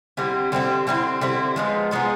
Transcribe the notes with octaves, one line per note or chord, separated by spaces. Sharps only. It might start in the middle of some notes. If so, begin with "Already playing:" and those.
D3 G3 C4 E4
D3 G3 C4 E4
D3 G3 C4 E4
D3 G3 C4 E4
F3 G#3 B3 D#4
F3 G#3 B3 D#4